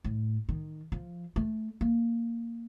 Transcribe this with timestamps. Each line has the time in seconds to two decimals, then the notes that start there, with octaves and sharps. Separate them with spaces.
0.04 A2
0.49 D#3
0.92 F3
1.36 A3
1.81 A#3